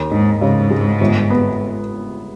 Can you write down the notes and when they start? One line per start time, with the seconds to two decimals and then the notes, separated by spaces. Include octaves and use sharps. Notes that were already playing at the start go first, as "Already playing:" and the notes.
Already playing: D#2
0.11 G#2 D#4
0.41 G#2 C#3
0.70 G#3
1.01 G1
1.30 B3